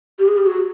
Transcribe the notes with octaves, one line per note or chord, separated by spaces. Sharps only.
G4
G#4
G4
F#4